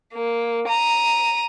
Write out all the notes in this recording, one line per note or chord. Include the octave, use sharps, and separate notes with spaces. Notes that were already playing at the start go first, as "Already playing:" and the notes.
A#3
A#5 D#7